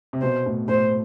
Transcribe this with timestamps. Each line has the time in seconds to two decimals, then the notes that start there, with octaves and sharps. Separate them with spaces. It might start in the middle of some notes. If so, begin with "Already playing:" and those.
0.13 C3
0.22 B2 C5
0.46 A2
0.68 A2 C5